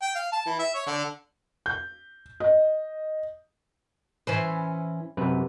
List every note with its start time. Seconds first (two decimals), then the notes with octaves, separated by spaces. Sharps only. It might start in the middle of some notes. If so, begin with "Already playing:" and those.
0.02 G5
0.15 F5
0.32 A5
0.46 E3
0.59 E5
0.74 C#5
0.87 D3
1.66 G6
2.40 D#5
4.27 E3 C#4 B4 C5
5.17 F#2 C3 B4